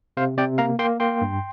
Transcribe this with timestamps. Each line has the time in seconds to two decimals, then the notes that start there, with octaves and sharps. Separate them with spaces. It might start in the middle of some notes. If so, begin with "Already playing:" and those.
0.17 C3 C5 F5
0.38 C3 D5 G5
0.58 A#3 F5 A#5
0.79 A#3 G5 C6
1.00 A#3 G5 C6
1.21 G2